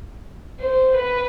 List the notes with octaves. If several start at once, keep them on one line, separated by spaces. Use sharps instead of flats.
C5
B4